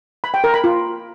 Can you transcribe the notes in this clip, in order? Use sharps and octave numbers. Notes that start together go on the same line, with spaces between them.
B5
G5
A#4
B5
F4